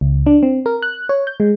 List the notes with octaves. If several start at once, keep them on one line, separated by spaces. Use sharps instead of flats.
C#2
D4
C4
A#4
F#6
C#5
G6
G#3